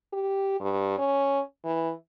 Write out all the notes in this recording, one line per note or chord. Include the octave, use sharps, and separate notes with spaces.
G4
G2
C#4
E3